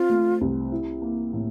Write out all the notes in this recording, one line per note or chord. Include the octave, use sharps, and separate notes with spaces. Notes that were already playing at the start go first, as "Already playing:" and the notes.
Already playing: C4 F4
A3
C2
E4
A#3
A2